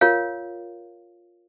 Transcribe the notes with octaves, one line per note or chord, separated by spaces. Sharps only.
F4 A#4 C#5 F5